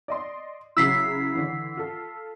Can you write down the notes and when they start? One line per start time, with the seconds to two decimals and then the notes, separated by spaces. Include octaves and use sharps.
0.08 D5 D#5 C6
0.77 C#3 F#3 E4 E6 B6 C7
1.35 D3 E3
1.77 F4 A4